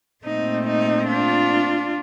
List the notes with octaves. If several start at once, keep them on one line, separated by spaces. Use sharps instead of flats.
A#2 A3 C4 D#4
D#4
D4 F4